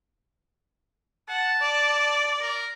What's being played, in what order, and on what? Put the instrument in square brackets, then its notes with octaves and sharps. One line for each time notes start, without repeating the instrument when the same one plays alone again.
[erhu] F#5 [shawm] A5
[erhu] D5
[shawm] A#4